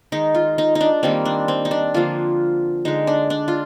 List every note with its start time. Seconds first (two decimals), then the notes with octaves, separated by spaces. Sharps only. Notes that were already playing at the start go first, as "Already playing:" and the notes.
0.12 D#3 G#3 D#4
0.35 F4
0.58 D#4
0.75 D#4
0.81 D4
1.03 D#3 G3 A#3 C4
1.25 D4
1.48 C4
1.65 D#4
1.71 D4
1.94 D3 F3 A#3 F4
2.85 D3 G#3 D#4
3.07 D4
3.30 D4
3.48 F4